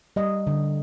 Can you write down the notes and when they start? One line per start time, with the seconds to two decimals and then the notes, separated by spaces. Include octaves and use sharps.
0.16 G3 D#5
0.47 D3